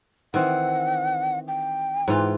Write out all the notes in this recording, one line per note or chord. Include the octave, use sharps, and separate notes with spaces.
D#3 E3 C4 F#5
G5
G#2 E3 F4